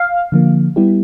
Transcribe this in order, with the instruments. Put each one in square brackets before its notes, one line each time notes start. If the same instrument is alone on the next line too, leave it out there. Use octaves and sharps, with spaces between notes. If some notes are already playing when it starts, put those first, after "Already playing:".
Already playing: [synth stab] F5
[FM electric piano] D3 F3 A#3
G3 B3 E4 G4